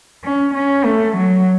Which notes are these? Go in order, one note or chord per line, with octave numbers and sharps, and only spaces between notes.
C#4
C#4
A3
F#3